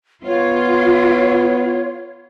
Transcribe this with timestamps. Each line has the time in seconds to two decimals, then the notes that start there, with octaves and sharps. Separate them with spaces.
0.25 B3 F4 C#5